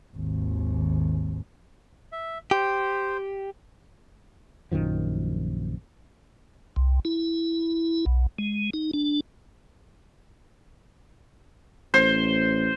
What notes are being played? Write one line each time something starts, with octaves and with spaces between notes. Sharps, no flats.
G#1 D#2
E5
G4 C5
A#1 F#2 D#3 F3
C2
E4
B1
G#3
D#4
D4
A1 C5